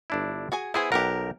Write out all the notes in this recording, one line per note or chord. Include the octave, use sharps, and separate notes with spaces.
G1 D4 E4
F#4 G#4 G#5
B3 E4 G#4 C5 G#5
B1 G4 A#4 F#5